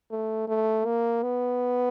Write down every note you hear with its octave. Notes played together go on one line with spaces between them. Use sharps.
A3
A3
A#3
B3